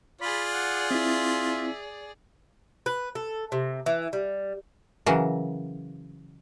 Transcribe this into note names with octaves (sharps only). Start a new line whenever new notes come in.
F4 G#4 D5 B5
F#5
C4 E4 E5
B4
A4
C3
E3
G3
C#3 E3 F#3 A#4